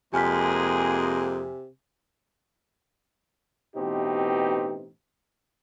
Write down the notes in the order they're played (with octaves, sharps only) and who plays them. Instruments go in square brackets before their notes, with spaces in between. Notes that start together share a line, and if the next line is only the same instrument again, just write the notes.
[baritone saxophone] F2 [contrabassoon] C3 [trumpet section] G#3 A#3 G#4 [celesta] G#5 F6 B6
[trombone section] A1 B2 E3 C4 D#4 G4